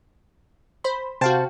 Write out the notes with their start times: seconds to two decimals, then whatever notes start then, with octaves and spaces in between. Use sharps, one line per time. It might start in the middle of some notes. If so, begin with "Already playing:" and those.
0.84 C5 B5
1.21 C3 F#4 C5 F5 G5 A5